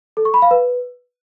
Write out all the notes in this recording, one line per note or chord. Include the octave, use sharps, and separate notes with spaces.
A4
C#6
B5
F5
B4